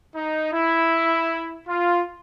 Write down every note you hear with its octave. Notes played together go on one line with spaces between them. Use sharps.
D#4
E4
F4